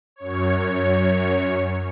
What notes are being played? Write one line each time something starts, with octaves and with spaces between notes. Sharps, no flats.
F#2 C#5